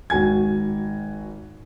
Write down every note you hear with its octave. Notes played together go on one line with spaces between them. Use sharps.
G#1 F#4 G#5 G#6